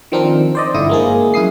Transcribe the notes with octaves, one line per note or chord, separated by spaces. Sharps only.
D#3 F3 C4 D4 A#4
C5 D5 D#5
G1 D3 E4 D#6
G#3 A#3 G#4
F#2 E4 D#6 C7